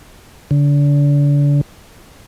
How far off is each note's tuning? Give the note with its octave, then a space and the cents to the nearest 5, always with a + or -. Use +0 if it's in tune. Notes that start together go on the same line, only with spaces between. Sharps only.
D3 -35